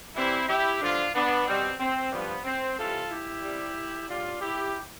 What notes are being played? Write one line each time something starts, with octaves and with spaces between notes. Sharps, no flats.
C3 E3 G3 C4 E4
E4 G4
G2 D3 F3 D4 F4
B3 D4
B2 G3 C4
C4
G2 F3 B3
C4
C3 E3 G3 F4 A4
E4 G4
C3 G3
A2 G3 D4 F4
E4 G4